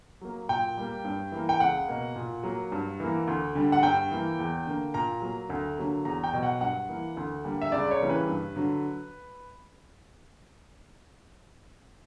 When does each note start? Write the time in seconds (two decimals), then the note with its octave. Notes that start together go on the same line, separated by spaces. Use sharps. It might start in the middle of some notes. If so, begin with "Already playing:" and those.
0.21 F#3 A#3
0.49 A#2 G5
0.77 G3 A#3
1.05 G2
1.32 E3 A#3
1.49 G5
1.60 C#2 F#5
1.88 B2 A#3
2.16 A#2
2.43 F#3 A#3
2.72 G2
3.00 E3 A#3
3.28 D2
3.55 D3 G3
3.72 F#5
3.83 G2 G5
4.11 E3 A#3
4.39 E2
4.66 D3 A#3
4.94 A#2 A#5
5.22 F#3 A#3
5.50 D2
5.78 D3 F#3 A#3
6.05 E2 A#5
6.24 G5
6.33 B2 F#3
6.43 F#5
6.61 G2 F#5
6.89 E3 A#3
7.17 D2
7.44 D3 G3 A#3
7.62 E5
7.72 C#2 D5
7.91 C#5
8.00 C#3 E3 G3 A#3
8.10 B4
8.28 G2
8.56 D3 F#3